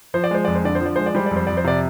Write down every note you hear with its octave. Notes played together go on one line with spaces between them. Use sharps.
F3 C5
D5
G#3 C5
F2 D5
C5
D3 D5
C5
F3
D5
G#3 C5
D5
G3 C5
F2 D5
C5
F2 D5
C5
C3 D5